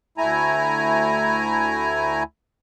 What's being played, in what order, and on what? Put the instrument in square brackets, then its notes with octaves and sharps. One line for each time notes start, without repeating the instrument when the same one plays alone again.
[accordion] D2 A3 E4 G#5 A#5